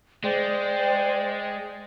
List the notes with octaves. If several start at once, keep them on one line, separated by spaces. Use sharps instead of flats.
G#3 C5 D5 G5